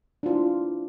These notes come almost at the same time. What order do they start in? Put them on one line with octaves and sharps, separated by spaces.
D4 F4 E4